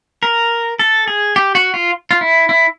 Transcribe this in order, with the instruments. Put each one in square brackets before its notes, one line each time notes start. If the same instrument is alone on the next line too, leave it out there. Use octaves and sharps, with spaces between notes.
[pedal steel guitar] A#4
A4
G#4
G4
F#4
F4
F4
E4
E4